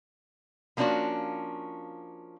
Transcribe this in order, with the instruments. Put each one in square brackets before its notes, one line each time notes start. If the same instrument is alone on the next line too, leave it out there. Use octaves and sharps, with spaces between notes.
[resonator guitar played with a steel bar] F3 A#3 C#4 D4 F4 F#4